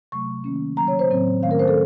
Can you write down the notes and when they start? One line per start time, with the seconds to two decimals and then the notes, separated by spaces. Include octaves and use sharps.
0.12 C3 F#3 A3 C#6
0.44 D#3 A#3 C#4
0.77 C#3 F#3 A#3 C#4 A#5
0.88 C#5
0.99 C5
1.10 A2 F#3 C4
1.42 D#3 A3 C#4 F5
1.51 A#4
1.59 C5
1.68 A4